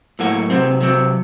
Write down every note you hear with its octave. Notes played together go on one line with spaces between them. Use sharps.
A2 F#3 A#3 F#4
C3 F#3 C4
C3 F#3 C4